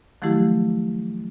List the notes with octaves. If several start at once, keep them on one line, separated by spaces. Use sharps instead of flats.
D#3 F3 F#3 A3 E4 G4